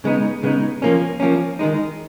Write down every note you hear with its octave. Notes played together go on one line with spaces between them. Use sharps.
C#3 G#3 B3 D#4
C#3 G#3 B3 D#4
F3 A#3 C#4
F3 A#3 C#4
D#3 G#3 D#4